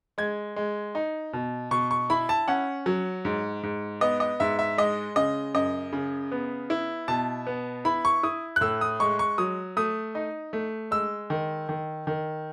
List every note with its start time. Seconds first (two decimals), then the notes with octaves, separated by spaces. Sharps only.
0.18 G#3 G#6
0.56 G#3
0.95 D#4
1.33 B2
1.71 B2 C#6
1.91 C#6
2.10 E4 B5
2.29 A5
2.48 C#4 F#5
2.86 F#3
3.25 G#2
3.63 G#2
4.01 B3 D#5
4.20 D#5
4.40 G#2 E5
4.59 E5
4.78 G#3 D#5
5.16 C#3 D#5
5.54 F#2 D#5
5.93 C#3
6.32 B3
6.70 E4
7.08 B2 A5
7.47 B3
7.85 E4 B5
8.05 C#6
8.23 E4 D#6
8.56 F#6
8.61 A2 E6
8.81 D#6
9.00 G#3 C#6
9.19 C#6
9.38 F#3 D#6
9.77 A3 D#6
10.15 D#4
10.53 A3
10.91 G#3 E6
11.30 D#3
11.69 D#3
12.07 D#3